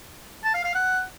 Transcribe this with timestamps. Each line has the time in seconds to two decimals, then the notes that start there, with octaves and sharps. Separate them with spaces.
0.44 A5
0.54 F5
0.64 F5
0.75 F#5